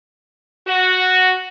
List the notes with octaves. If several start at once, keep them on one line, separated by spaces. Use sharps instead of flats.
F#4